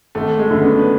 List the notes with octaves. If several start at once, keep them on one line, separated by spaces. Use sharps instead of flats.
G#1 A3
G#3
F#2 D3 A3
B3 D4
B4